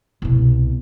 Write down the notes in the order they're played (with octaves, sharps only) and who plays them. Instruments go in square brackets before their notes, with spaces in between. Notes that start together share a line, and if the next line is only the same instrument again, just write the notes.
[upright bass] C2 B2